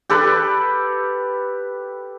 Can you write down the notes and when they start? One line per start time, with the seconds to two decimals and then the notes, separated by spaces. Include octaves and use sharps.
0.10 G4 A4 B4